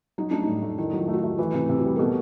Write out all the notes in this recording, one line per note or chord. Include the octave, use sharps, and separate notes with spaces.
F#3 D#4
A3 D4
A2 D#4
A3
D#3 E4
F#3
F4
A3
F#4
F4
A3
E3 F#4
C3
C3
G3 F#4
A#4
B2 A4